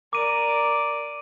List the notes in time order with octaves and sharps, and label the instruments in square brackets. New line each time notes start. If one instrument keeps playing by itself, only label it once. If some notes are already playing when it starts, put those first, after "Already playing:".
[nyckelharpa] A#4 D5 [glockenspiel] D6 D#7